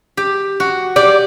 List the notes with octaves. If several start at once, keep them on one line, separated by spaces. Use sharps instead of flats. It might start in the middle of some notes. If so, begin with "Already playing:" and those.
G4
F#4
G4 D5